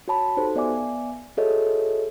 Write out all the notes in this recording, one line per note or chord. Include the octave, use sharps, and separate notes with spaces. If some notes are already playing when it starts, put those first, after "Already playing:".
F#4 C#5 A5 B5
D#4 F#4 G4 A4 C5
B3 D5 E5 G#5 D6
F#4 G#4 A4 C#5 D#5 E5